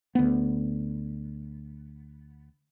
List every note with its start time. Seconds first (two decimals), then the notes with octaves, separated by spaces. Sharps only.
0.15 D2 B3